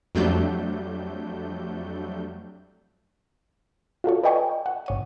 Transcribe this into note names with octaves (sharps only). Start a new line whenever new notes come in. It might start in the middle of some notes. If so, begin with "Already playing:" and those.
F2 F#3 G3 A3 D4 G6
F4 F#4 A4 C#5
B4 D5 D#5 G5 G#5 C#6
F#5
G1 C#5 D#7